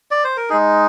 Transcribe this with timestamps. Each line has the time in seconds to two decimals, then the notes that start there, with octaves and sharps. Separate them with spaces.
0.11 D5
0.24 C5
0.37 A#4
0.49 G#3 D#4 G#4